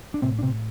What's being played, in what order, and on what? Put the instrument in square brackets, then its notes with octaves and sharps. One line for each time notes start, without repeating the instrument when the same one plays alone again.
[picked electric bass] D4
A2 C3 C4
D4
C3 C4